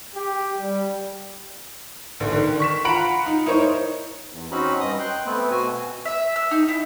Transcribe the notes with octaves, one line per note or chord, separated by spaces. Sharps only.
G4
G3
A#1 D3
D3 D#3
C#6 B6 E7
F4 F#5 A#5 B5 D7 F#7
D#4
D#4 E4 A#4 C5 C#5
E2
C4 C#4 D#4 F#4 B5
G2 D#5 D#6
G5 C6 F#6
A3 B3 C4 B4
B2 F#4 G#5
E5
E6
D#4
E4